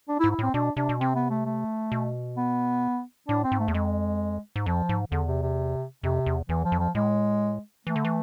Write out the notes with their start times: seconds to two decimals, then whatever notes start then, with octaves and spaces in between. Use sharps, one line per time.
0.09 D4
0.20 E4
0.24 G#2
0.31 E4
0.39 A2 C4
0.54 B2 D4
0.77 C3 D4
0.89 B2
1.00 C3 C4
1.16 B3
1.30 A3
1.46 A3
1.92 B2
2.37 B3
3.28 A2 D4
3.44 C4
3.52 G#2
3.60 A3
3.68 E2
3.74 F2 G#3
4.56 G#2
4.66 F2 F3
4.89 G#2
5.12 E2 D3
5.27 C3
5.42 C3
6.03 F2 C3
6.26 E2
6.49 E2 E3
6.65 F3
6.72 F2
6.80 F3
6.95 A2 G#3
7.87 E3 A3
7.96 D3
8.05 E3